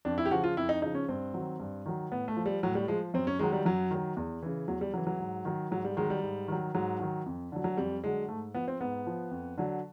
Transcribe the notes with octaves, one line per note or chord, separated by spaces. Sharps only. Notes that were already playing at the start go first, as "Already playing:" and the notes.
F2 D4
E4
G4
C#3 F3 F#4
F4
F2 E4
D#4
C#3 F3 D#4
C#4
G2 C4
D#3 F#3
G2
D#3 F#3
A2 B3
A3
F3
G3
A2 F#3
G3
F3 G#3
F#2 C4
C#4
D#3 F#3 G#3
G3
F#2 F#3
D#3 F#3
E2
C#3 E3
E2 F#3
G3
C#3 E3 F#3
F#3
G#2
D#3 F#3
G#2 F#3
G3
D#3 F#3 G#3
G3
G#2
D#3 F#3
G#2 F#3
D#3 F#3
F2
D3 F#3
F#3
F2 G3
D3 F#3 G#3
G#2 A3
F3 B3
C4
G#2 B3
F3
F2
D3 F#3